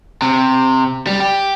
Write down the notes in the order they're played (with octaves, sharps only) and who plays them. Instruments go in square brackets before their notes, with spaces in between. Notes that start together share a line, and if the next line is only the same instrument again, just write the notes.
[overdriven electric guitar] C3
G3
G4